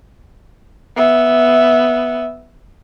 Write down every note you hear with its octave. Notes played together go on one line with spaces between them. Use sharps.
B3 E5